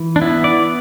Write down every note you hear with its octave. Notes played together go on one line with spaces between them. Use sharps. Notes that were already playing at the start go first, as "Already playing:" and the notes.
Already playing: E3
D4
B3 E4
D5